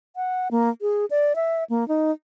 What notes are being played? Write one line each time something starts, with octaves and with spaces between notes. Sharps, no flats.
F#5
A#3
G#4
D5
E5
A#3
D#4